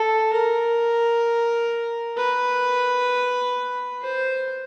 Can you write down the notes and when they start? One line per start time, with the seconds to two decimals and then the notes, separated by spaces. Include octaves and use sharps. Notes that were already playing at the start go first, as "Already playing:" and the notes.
Already playing: A4
0.33 A#4
2.17 B4
4.02 C5